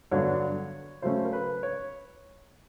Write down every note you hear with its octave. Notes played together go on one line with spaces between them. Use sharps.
G2 D3 F#3 B3 D4 C#5
C#3 F#3 A3 C#4 C5
A#4
B4
C#5